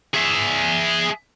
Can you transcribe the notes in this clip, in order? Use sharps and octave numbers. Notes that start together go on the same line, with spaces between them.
G#4 E5